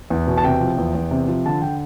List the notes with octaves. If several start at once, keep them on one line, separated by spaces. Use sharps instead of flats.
E2
B2
A5
C3 G5
F3
E2
E2
C3
F3
D3 A5
D3 G5